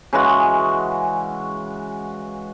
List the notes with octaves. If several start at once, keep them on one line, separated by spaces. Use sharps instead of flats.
C#3 E3 G#3 F#4